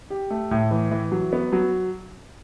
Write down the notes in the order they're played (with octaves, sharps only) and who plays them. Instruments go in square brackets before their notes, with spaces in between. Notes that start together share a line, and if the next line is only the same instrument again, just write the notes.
[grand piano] G4
A3
A2
E3
E3
F#3
B3
F#3